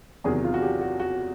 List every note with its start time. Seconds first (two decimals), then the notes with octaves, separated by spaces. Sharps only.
0.24 E2 C3 D#3 F#3 G#4
0.44 F4
0.54 F#4
0.62 G4
0.81 F#4
1.00 F#4